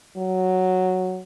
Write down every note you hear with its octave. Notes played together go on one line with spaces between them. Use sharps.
F#3